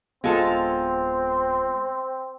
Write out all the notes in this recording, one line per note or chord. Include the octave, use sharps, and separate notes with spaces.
D1 D#2 G#3 B3 C4 F4 A4